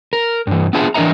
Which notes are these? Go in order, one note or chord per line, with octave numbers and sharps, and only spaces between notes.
A#4
G2 E3
B3 D4 F4 G#4 E5 A5
E3 D4 A#4 D#5 E5 A#5